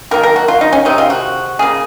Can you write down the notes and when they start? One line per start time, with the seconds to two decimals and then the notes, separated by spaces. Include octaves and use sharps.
0.11 D#3 F#3 A#3 A#4
0.24 A#4
0.36 F#4
0.48 F4
0.61 D#4
0.73 C#4
0.85 C3 D#3 G#3 D#4
0.98 F4
1.10 F#4
1.59 C#3 F3 A#3 G#4